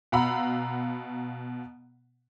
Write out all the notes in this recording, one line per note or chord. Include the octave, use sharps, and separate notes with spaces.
B2 F5 F#5 A#5 B5 E6